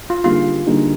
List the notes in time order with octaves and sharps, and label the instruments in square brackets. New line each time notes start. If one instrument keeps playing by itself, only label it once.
[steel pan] F4
[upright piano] D3 G3 A#3 D#4 G#4 [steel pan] F4
[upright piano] D3 G3 A#3 D#4 G#4